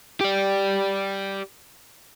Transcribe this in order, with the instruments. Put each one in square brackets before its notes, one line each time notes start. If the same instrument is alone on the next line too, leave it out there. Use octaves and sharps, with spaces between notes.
[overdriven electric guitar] G4 D5